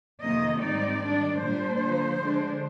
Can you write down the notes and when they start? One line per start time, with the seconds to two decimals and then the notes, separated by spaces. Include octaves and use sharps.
0.22 F2 C3 D#3 A#3 D#5
0.61 G#2 D#3 G3 C4 D#4 D5
1.01 D#3 G3 D4
1.39 A#2 G3 A#3 D4 C5
1.79 D3 F3 A#3
2.19 D3 G#3 D4